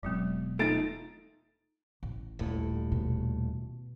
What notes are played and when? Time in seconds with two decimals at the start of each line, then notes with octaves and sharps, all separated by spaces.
0.03 E1 B2 F#3 G#3 C4
0.59 A3 D#4 F4 A4 A6 D7
2.03 A1
2.39 D#1 A2
2.92 B2